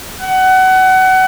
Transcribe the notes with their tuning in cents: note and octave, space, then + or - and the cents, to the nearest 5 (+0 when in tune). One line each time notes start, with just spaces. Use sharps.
F#5 +25